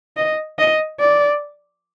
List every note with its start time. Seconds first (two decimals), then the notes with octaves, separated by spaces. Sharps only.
0.17 D#5
0.58 D#5
1.00 D5